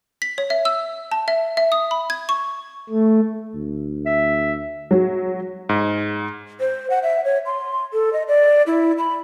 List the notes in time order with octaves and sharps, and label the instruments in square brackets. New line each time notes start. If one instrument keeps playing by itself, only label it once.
[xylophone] B6
C#5
E5
E6
A5
E5
E5
D#6
B5
G#6
C#6
[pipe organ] A3
[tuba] D2
[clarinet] E5
[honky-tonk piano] F#3
[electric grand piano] G#2
[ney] C5
F#5
E5
C#5
C6
A4
D#5
D5
E4
B5